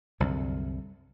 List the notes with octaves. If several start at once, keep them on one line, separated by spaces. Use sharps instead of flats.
C2 F#2 D3